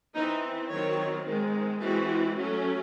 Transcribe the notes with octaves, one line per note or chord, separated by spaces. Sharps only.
E3 C4 D#4
D#3 F#3 C4 C#5
D#3 G#3 C4
E3 G#3 C4 F#4
F#3 A3 C#4